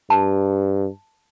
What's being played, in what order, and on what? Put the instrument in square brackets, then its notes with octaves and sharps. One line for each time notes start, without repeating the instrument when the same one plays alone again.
[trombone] G2 [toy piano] A5